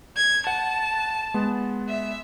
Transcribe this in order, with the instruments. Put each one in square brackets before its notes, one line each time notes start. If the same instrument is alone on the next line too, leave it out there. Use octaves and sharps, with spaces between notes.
[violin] G#6
[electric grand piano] F#5 [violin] A5
[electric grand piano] G#3 B3
[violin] E5